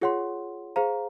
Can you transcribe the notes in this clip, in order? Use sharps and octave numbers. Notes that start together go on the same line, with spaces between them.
F4 G#4 C#5 F#5 C6
G#4 C5 F5 A#5